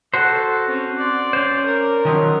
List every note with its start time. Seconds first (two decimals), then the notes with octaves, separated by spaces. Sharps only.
0.14 F#4 A4 C5
0.68 C4 C#4
0.98 D5 C6
1.33 C#4 C5
1.65 A#4
2.05 D#3 F3 F#3